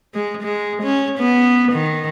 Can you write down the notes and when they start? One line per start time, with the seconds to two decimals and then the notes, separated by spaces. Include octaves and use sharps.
0.14 G#3
0.43 G#3
0.83 C#4
1.19 B3
1.73 D#3